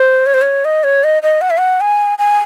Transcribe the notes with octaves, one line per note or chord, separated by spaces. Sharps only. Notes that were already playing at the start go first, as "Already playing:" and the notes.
Already playing: C5
C#5
C5
C#5
D#5
C#5
D#5
D#5
F#5
E5
F#5
G#5
G#5